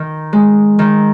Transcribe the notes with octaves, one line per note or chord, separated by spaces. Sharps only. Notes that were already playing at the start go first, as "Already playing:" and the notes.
Already playing: D#3
G#3
D#3